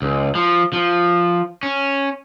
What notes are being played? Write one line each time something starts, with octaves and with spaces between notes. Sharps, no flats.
C#2
F3
F3
C#4